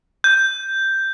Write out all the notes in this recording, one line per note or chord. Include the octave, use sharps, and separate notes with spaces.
G6